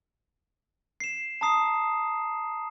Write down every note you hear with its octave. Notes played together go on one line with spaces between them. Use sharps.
C7 E7
A5 A#5 D#6 C7